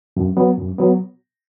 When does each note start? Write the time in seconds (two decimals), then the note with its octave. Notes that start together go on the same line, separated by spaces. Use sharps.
0.17 F#2
0.37 F#3 B3
0.58 F#2
0.78 F#3 B3